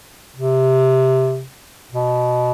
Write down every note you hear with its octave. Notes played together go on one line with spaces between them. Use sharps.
C3
B2